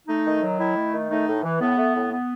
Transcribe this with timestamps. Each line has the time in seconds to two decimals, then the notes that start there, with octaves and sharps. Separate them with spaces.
0.07 A3 D#4
0.25 D#3
0.41 F#3
0.58 D#3 E4
0.76 A3
0.93 D#3
1.10 A3 D#4
1.27 A2
1.43 E3
1.60 A2 B3
1.77 A3
1.95 A2
2.12 B3